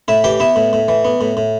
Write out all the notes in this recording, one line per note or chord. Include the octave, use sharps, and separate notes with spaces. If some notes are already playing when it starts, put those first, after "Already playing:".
A2 E4 E5
E3 G4 G5
B3 E4 E5
A2
A2
E3
B3
A2
A2